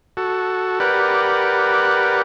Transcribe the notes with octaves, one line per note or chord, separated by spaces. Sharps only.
F#4 A4
G4 A#4 B4 D5 F#5